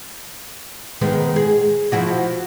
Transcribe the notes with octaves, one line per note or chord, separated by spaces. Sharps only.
D#3 G#3 B3
G#4
F3 E4 F#4